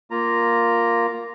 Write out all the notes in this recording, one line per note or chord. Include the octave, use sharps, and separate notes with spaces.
A#3 F4 A#5